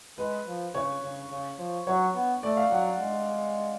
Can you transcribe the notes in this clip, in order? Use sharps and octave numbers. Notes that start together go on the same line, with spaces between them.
G#3 B4
F3
C#3 C#5
C#3
C#3
F3
F#3 C#5
B3
A3 D5
F5
F#3 F#5
G#3